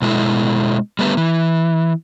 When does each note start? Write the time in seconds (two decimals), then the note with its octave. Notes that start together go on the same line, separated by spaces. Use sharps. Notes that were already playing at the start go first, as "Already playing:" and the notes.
0.02 B2 G#3 E4 A4
0.99 G3 A3 B3
1.17 E3